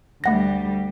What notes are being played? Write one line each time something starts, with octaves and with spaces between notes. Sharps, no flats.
D2 G3 A3 F#5 A#6